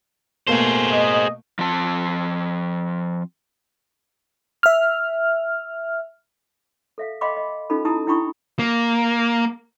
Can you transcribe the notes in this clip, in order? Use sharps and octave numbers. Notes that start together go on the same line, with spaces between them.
B2 A3 A#3 G#4 C5
D#5
F3 C4 A5
E5 F6
A4 E5 F5
D#5 F5 G5 B5 C6 D6
D#5
C#4 D#4 F4 A4 B5
D#4 E4 G4 A5 A#5 D#6
D4 E4 G5 B5 C#6 D#6
A#3